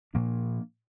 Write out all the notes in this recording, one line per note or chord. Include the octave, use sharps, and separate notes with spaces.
A#2 F3 A#3 D4